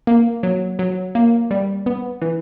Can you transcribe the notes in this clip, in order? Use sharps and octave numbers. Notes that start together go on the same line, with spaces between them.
A#3
F#3
F#3
A#3
G3
B3
E3